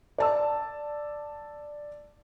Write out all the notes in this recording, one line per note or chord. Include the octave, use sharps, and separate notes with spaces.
D5 A5 E6